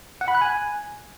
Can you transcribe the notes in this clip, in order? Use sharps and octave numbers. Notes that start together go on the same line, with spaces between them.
F#5
B5
F#6
G#5